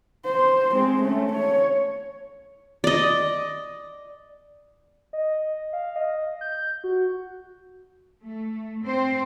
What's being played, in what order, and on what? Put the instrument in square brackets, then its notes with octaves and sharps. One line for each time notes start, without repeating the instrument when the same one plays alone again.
[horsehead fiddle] C5
G#3 C4
A3 C#4
C#5
[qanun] D5 D#5
[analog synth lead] D#5
F5
D#5
G6
F#4
[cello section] A3
C4 C5